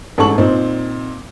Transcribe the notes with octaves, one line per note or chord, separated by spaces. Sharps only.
A1 G#2 A4 A5 C#6 F#7
A#2 C4 D#4